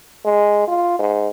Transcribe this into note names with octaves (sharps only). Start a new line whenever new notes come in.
G#3
F4
G#2